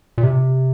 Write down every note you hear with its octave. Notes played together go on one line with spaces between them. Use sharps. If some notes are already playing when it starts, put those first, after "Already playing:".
A#2
C3